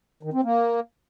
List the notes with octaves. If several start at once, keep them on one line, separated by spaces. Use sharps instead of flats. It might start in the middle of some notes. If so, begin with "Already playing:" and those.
D#3
C4
A#3